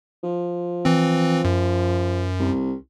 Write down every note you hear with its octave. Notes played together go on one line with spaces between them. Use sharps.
F3
E3 C4
F#2
C2